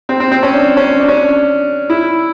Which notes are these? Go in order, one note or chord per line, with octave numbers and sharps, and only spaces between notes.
C4
C4
C4
C#4
D4
C#4
D4
C#4
D4
E4